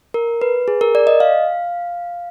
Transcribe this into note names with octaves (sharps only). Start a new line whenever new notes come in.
A#4
B4
G#4
A#4
D5
D#5
F5